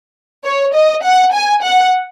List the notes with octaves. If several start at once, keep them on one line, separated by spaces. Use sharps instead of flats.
C#5
D#5
F#5
G#5
F#5